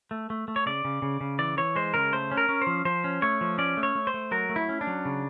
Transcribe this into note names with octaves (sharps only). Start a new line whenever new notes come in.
A3
A3
A3
C#5
C#3 D5
C#3
C#3
C#3
E3 D5
E3 C#5
G#3 C5
C#3 A#4
A3 C5
C#4
A#4
C#4
C5
F3
F3 C5
C#4
A3 C#5
F3
C#4 D5
A3
C#5
A3
C5
A3
F#3 A#4
A3
E4
C#4
D4
F#3
C#3